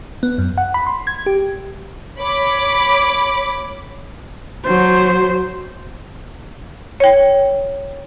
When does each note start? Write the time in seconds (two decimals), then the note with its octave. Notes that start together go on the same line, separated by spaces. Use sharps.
0.23 B3
0.38 F#2
0.58 F#5
0.74 B5
0.87 C6
1.07 G#6
1.26 G4
2.19 C#5 B5 D6
4.66 F#3 C5
7.00 C#5 G5